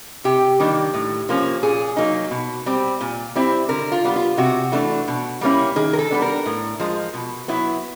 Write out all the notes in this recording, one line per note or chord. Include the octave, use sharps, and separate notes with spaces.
C3 G4
D#3 G3 A#3 D4
A2
F3 A#3 C#4
A#2 G#4
F#3 A#3 D#4
B2
G3 C4
A#2
G3 C4 E4
D3 A#4
F4
G3 B3
F4
C3 F#4
E3 A3 D4
B2
G3 A#3 C#4 E4
D#3 G#4
A#4
A4
G3 B3 D4
A#4
A2
F3 G#3
B2
F#3 B3 E4